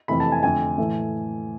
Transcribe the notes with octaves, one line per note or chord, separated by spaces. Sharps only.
F2 C3 E3 A3 B5
A5
G#5
F2 D3 A3 G#5
A2 E3 A3